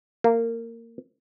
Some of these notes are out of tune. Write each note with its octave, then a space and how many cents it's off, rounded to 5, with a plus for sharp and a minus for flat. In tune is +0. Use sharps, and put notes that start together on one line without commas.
A#3 -20